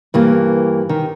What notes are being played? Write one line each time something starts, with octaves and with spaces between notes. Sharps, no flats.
G2 E3 A#3
D#3